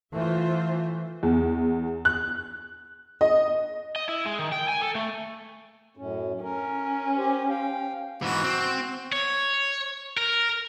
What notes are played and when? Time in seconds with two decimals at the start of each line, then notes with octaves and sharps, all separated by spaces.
0.14 E3 A3 F4 C5 E5
1.23 E2
2.05 F#6
3.21 D#5
3.96 D#5
4.09 E4
4.26 G#3
4.39 D#3
4.52 G5
4.69 G#5
4.82 A4
4.95 A3
5.97 F#2 A2 C#4
6.43 C#4 A#4
7.17 G4 C5
7.49 F5 G5
8.22 G#2 E3 F#4
8.44 C4
9.12 C#5
10.17 A#4